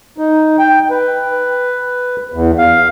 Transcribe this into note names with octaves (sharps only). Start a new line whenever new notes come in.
D#4
G5
B4
E2
F5